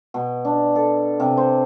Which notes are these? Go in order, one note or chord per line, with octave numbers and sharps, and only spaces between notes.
B2
D4
A4
C3
C5